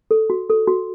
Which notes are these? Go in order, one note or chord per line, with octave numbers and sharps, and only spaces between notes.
A4
F#4
A4
F#4